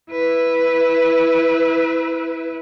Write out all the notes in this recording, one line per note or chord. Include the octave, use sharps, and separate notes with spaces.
E4 B4